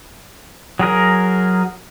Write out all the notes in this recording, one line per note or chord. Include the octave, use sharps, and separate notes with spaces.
F#3 G#4 A#4